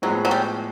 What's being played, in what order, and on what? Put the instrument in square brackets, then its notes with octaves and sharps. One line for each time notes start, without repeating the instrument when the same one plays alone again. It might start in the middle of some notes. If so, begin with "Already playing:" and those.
[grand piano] A2 F3 G#3 B3 [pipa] F#3
[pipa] F#3
G3